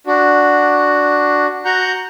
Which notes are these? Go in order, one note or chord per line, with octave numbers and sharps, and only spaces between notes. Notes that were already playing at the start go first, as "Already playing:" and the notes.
D4 F#4
F#4 F#5 A#5 C#6 G6